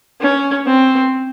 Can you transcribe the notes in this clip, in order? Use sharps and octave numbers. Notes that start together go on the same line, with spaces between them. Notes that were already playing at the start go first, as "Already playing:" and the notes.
C#4
C4